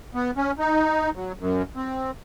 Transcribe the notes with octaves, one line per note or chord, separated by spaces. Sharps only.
B3
C#4
D#4
F#3
F#2
C4